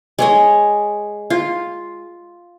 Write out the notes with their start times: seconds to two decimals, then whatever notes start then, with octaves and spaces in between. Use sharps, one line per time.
0.19 G#3 C#5 D#5
1.30 F4